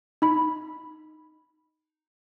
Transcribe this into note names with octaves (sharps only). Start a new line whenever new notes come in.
D#4 B5